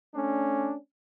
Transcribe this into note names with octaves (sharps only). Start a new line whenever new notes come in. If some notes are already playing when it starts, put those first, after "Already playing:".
A3 C#4 D4